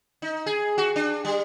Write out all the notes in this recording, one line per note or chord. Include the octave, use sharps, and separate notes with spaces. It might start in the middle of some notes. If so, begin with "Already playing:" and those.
D#4
G#4
F#4
D4
G3